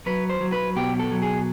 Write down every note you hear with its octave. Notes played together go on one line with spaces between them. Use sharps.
F#3 B4
C5
F#3
B4
B2 G4
A4
F#3
G#4